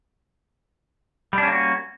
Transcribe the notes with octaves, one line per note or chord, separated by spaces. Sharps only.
G3 A#3 C#4 D4 F#4